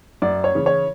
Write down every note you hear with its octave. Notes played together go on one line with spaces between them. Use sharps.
F#2 D5
C#5
C#3 E3
C#5